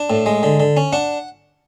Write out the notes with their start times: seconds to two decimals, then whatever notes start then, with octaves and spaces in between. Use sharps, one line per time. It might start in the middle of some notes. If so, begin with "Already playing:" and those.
Already playing: D4
0.10 A2
0.26 G#3
0.43 D3
0.60 D3
0.77 C#4
0.93 D4 F#5